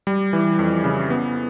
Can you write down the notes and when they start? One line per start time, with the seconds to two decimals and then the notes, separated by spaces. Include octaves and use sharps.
0.07 G3
0.33 E3
0.59 F2
0.84 C#3
1.10 B3